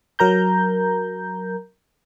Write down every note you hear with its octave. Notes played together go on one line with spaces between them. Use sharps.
F#3 A#4 A#5 G6